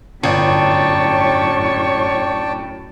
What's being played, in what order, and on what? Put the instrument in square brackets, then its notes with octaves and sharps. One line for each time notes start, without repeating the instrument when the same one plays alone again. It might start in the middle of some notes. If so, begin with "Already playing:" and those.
[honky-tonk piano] G1 [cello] F#2 A2 [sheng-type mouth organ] D4 G5 A5 [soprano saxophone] C#5